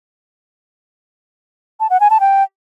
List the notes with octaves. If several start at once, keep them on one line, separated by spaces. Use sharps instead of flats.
A5
F#5
G#5
A5
G5